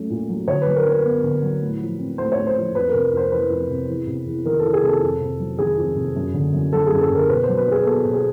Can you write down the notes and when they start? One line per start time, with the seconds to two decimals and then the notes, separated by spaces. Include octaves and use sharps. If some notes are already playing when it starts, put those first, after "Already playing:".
Already playing: F#3 A3 C#4
0.10 A#2
0.29 F#3
0.48 D3 C#5
0.62 F#3 B4
0.76 A#4
0.85 D4 B4
1.04 B3
1.23 D3
1.43 F#3
1.61 A2
1.80 F3
1.99 C4
2.18 A3 C5
2.32 A2 C#5
2.47 C5
2.56 F3
2.75 F2 B4
2.89 C3 A#4
3.12 F2 C5
3.32 E3 B4
3.50 F2
3.69 C3
3.88 E2
4.07 C3
4.26 E2
4.45 D#3 A#4
4.59 E2 A4
4.73 G#4
4.83 C3 A4
5.02 F2
5.20 C3
5.39 F#3
5.59 D#3 G#4
5.78 F2
5.96 C3
6.16 F#2
6.34 D3
6.53 F#2
6.73 F#3 A4
6.86 G#4
6.91 F#2
7.01 A4
7.10 D3 A#4
7.29 B2 B4
7.43 C5
7.48 F#3
7.57 B4
7.67 D4 G#4
7.85 B3 A4
8.05 B2
8.14 G#4